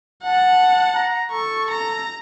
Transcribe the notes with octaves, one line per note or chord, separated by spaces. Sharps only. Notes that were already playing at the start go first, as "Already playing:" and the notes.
F#5 A5
A#5
A4 C#6
A#5